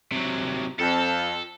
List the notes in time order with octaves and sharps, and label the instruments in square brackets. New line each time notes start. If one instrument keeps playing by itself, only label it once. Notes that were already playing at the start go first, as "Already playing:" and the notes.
[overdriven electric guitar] C3 F#3
[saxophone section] F2 [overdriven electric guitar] A4